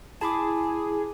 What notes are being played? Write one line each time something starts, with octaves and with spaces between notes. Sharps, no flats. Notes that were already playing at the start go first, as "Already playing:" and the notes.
E4 G#4 A5 B5 D6